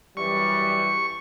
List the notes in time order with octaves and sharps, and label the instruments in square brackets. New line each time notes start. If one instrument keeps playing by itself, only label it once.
[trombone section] F#2 E3 G3 [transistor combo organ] C#6